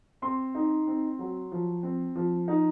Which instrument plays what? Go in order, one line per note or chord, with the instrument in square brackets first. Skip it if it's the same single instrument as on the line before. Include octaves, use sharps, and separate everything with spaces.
[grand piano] C4 C6
D#4
C4
F#3
F3
C4
F3
D#4